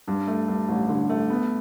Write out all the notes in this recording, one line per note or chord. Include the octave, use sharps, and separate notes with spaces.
G2
A3
G2
A1
D3
A3
B3